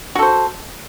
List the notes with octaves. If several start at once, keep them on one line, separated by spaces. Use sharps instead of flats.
F#4 A4 C5